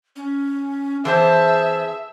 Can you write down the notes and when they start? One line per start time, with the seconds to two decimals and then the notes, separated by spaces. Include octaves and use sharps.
0.16 C#4
1.05 E3 C4 G#4 C5 E5 A5